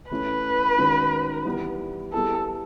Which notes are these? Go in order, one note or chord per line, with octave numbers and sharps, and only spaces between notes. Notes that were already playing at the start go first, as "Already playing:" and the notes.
E3 A3 C#4 E4 B4
D#3 G#3 C#4 F#4
E3 G3 B3
G3 B3 E4 G#4 A4